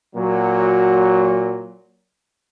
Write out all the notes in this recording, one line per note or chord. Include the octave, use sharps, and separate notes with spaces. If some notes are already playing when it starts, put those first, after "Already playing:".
A#2 F#3